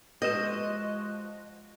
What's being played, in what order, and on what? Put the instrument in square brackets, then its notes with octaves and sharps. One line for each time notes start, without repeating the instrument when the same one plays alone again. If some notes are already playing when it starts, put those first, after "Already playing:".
[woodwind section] F3 G#3 F#4 [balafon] G4 B4 [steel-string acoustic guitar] D#5